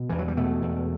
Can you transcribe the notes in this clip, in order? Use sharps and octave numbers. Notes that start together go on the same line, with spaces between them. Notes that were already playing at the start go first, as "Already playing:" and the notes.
Already playing: B2
E2 E3
F#3
G3
B2 A3
E2